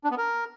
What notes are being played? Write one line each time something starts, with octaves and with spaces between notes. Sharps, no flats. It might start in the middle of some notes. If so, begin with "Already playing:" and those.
D4
B3
A#4